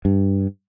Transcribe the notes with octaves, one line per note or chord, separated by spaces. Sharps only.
G2